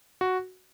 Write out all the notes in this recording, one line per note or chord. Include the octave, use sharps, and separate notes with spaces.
F#4